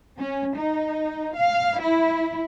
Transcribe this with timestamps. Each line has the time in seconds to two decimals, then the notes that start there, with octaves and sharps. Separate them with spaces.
0.18 C#4
0.55 D#4
1.36 F5
1.80 E4